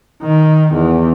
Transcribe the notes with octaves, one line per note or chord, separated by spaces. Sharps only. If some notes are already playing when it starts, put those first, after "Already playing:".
D#3
E2